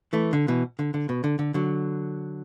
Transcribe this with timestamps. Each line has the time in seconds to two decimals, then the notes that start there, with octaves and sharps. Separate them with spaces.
0.13 E3 A3
0.33 D3
0.48 B2 E3
0.79 D3
0.94 D3
1.09 B2
1.24 D3
1.39 D3
1.54 D3 F#3